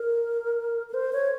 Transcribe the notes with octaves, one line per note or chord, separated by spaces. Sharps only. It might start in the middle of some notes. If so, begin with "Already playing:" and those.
Already playing: A#4
A#4
C5
C#5